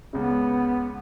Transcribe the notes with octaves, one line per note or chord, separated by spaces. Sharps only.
C#2 C#3 B3